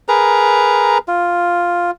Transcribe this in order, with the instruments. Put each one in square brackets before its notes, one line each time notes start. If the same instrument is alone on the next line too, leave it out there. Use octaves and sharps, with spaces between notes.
[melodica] G#4 A#4 B4 A#5
F4